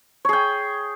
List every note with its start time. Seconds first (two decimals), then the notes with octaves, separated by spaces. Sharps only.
0.25 C#5
0.29 G#4
0.33 G5